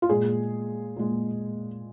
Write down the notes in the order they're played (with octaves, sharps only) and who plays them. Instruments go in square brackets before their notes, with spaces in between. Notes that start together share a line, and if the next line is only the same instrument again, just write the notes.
[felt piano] F4
A#2 G#3 G#4
A#2 G#3